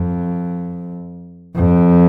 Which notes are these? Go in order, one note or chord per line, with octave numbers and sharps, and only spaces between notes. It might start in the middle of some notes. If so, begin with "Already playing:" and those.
Already playing: F2
F2